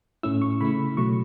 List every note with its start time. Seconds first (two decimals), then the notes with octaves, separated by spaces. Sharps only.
0.23 A2 A3 C#4 E4 E6
0.42 C#6
0.61 C#3 A3 E4 B5
0.97 B2 F#3 A3 C#6